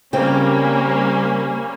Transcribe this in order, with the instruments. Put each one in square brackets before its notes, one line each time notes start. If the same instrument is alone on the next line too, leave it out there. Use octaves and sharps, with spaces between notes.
[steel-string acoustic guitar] C#3 C4 [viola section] G3 A#3 C#4